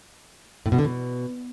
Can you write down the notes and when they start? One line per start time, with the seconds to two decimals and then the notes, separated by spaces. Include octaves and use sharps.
0.66 A2
0.72 B2
0.78 D3
0.85 B2